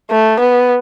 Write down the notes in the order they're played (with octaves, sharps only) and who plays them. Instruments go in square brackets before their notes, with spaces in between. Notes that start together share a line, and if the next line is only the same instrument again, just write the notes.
[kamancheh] A3
B3